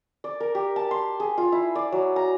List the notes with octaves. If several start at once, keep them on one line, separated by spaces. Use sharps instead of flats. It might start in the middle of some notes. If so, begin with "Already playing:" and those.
D5
A#4
G4
A5
C6
G#4
F4
E4
D5
F#3
A#5